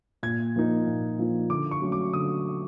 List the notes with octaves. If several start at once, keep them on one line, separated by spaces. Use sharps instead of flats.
A#2 G#6
F3 A#3 D#4
A#2
F3 A#3 D#4
D3 D6
C#6
F#3 A3 C#4
D6
D3 D#6